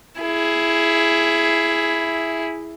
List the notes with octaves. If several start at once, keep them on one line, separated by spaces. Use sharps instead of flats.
E4 G#4